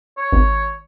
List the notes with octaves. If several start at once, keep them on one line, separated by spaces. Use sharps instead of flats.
C#5
G#1